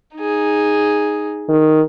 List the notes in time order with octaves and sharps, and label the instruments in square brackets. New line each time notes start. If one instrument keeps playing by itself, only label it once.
[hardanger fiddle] D#4 G#4
[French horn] D#3